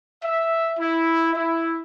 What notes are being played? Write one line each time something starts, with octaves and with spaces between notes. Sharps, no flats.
E5
E4
E4